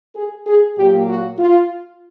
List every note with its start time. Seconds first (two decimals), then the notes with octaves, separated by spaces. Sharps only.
0.16 G#4
0.47 G#4
0.77 A#2 F#3 A#3 G4
1.08 F#4
1.39 F4